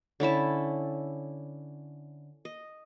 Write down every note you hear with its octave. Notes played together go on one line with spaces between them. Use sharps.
D3 C#4 E4 A5
D#5